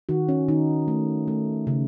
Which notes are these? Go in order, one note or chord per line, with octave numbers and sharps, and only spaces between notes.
D#3 F#4
C#4
D#3 D#4
A3
A3
C#3